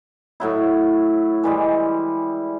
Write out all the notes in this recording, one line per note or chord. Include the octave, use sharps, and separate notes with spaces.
A2 F#3 E4
E3 G3 G#3